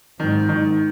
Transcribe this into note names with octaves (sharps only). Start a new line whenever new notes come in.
G#2 D#3
D#3